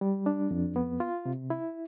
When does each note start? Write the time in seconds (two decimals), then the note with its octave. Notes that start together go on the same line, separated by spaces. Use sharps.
0.01 G3
0.26 D4
0.51 F2
0.76 B3
1.00 F4
1.25 C3
1.50 E4